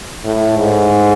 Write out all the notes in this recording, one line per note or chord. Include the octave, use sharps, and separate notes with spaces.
A2
G#2